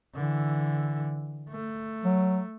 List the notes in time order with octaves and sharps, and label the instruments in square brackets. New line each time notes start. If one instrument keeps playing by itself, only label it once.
[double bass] D3 E3
A3
[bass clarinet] F#3